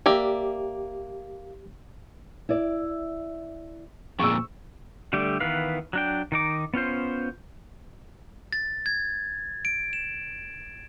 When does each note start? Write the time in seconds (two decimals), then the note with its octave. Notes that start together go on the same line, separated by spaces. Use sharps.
0.06 A#3 G4 D5 E5
2.49 E4 D5
4.19 F2 A#2 C#6 E6
5.13 D3 G3 A3 G4
5.40 D#3 E3 B3 B4 F5
5.93 F#3 D4 G5
6.32 D#3 D#4 D6
6.74 B3 C#4 F4 C5
8.52 A6
8.86 G#6
9.65 D7
9.93 E7